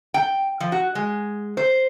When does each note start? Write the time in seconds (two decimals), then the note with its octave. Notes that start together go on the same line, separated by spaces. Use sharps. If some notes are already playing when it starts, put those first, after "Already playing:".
0.14 G5
0.60 F3
0.72 F#4
0.95 G#3
1.57 C5